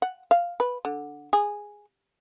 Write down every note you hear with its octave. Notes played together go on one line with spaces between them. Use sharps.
F#5
F5
B4
D3
G#4